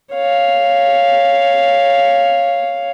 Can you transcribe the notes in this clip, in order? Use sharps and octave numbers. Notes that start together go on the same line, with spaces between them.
C#5 F5